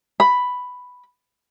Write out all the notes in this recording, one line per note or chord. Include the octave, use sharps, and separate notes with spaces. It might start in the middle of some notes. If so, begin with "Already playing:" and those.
B5